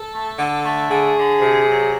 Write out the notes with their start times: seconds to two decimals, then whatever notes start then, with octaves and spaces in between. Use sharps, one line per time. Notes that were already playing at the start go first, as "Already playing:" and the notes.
Already playing: A4
0.12 A3
0.38 D3
0.64 A3
0.90 D3 G#4
1.15 D3
1.41 C3
1.68 F#3